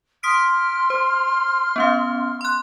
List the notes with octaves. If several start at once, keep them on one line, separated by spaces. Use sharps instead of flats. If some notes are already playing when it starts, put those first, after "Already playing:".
C6 D#6 F6 B6 D7
C5
B3 C#4 F5
C6 F#6